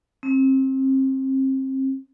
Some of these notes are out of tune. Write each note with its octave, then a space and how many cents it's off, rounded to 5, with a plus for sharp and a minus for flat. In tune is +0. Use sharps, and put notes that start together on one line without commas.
C4 +30